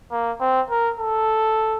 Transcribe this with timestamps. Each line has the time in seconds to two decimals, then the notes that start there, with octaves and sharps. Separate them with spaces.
0.11 A#3
0.40 C4
0.70 A#4
1.00 A4